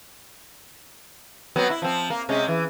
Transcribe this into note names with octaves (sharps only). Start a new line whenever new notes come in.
F#3 B3 C4
E4
F3 C4
A#3
C3 G#3 C#4
E3